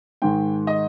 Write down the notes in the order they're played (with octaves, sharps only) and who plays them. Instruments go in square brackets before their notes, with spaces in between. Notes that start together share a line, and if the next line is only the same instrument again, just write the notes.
[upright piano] G#2 D#3 G#3 G5
D#5